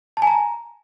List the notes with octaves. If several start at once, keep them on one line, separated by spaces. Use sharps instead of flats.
A5
G#5
A#5